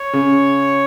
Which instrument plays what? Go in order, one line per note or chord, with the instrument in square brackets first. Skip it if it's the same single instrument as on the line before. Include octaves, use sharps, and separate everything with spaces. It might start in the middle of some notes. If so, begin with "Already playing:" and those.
Already playing: [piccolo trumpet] C#5
[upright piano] C#3